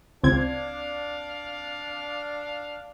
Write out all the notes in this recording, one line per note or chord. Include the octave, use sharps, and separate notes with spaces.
C#2 C4 D4 F5 G#6